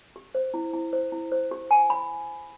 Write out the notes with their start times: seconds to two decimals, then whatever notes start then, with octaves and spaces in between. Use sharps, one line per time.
0.16 G4
0.35 C5
0.54 E4
0.73 E4
0.93 C5
1.12 E4
1.32 C5
1.51 G4
1.71 G#5
1.90 B5